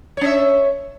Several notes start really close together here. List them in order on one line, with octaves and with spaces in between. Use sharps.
C#5 C#4 E5